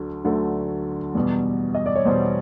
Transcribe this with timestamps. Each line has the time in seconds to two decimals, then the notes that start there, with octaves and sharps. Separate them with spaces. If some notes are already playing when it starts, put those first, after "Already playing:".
Already playing: D2 D3 F#3 A3
0.24 D2 D3 F#3 A3
1.15 E2 B2 G3
1.75 D#5
1.86 D5
1.96 C#5
2.05 E2 B2 G3 C5